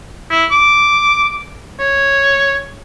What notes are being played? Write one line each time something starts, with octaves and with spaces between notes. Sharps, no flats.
E4
D6
C#5